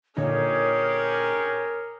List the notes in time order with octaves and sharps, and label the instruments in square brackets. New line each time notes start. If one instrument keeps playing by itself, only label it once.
[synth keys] A#2 D3 D#4 [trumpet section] C#4 G4 G#4 [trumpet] A#4 [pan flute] C#5